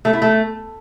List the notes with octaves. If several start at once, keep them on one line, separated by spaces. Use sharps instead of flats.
A3
E4
A3